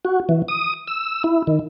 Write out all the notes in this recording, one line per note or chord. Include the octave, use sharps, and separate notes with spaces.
F#4
E3
D#6
E6
E4
D#3